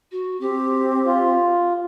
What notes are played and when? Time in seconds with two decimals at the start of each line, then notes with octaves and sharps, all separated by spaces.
0.11 F#4
0.40 C4 G4
1.06 F4